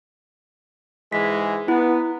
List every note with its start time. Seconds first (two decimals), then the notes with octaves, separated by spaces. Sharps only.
1.12 G#2 E3 G#3 B6
1.68 B3 E4